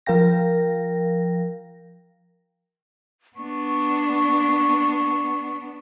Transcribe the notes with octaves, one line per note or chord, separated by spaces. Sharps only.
F3 A#4 F5 G5 A#6
B3 D4 C#6